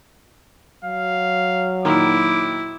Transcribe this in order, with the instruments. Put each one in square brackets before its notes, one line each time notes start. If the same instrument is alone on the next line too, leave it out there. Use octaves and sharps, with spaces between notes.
[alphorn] F#3 [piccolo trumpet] F5
[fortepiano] A#2 D#3 [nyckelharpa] E4 [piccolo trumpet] D6